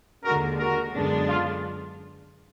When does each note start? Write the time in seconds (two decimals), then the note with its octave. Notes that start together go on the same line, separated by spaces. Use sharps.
0.24 D#2 D3 G#3 F#4 A#4
0.59 F#4 A#4
0.93 F#2 D3 G#3 B3 D4
1.28 F4